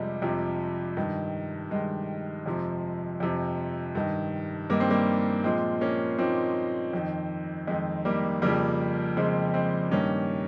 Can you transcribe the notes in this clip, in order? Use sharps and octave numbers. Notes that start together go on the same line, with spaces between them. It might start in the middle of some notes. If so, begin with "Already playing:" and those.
Already playing: F2 C3 F3 G3 G#3
F2 C3 F3
G2 D#3
G2 D#3 G#3
F2 C3 F3
F2 C3 F3
G2 D#3
G2 D#3 A#3
C4
G3 A#3
A#2 F3 G#3 C4
A#3 C#4
A#2 F3 C4 D#4
F2 D#3
F2 D#3 G#3
G3 A#3
F2 C#3 F3 G3 A#3
F2 C#3 F3 G#3 C4
G#3 C4
G2 D#3 A#3 C#4